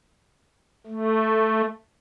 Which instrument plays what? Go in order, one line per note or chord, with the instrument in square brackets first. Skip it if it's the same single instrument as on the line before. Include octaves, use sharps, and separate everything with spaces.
[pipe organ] A3